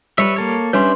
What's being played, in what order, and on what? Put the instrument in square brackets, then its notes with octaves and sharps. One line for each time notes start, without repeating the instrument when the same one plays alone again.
[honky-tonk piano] G3 [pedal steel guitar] B4 C#5 E5
[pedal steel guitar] A#3 A4 C#5
[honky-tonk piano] G3 C#4 [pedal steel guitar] D4 E5 G6 [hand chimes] B4 C6